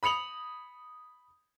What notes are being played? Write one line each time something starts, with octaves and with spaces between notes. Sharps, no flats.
B5 D#6 C#7 F7 F#7